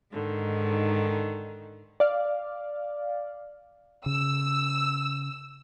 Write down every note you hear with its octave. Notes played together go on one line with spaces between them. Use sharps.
G#2 D3 D#3
D5 F5
C#3 E6